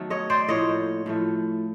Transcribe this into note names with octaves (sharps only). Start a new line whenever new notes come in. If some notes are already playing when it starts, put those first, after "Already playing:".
Already playing: D#3 F#3 A3 B3
C#5 D#5
C5 D5
A2 F3 A#3 C#5 D#5
A2 F3 A3